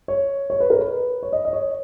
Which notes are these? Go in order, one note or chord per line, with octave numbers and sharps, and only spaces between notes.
C#5
C#5
B4
A#4
B4
C#5
D#5
D#5
C#5